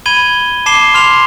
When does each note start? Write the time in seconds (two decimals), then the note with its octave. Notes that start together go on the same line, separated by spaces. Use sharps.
0.06 B5 G#6 D#7 G7
0.66 A5 D6 C7 E7 G7
0.94 C6 F6 C7 F7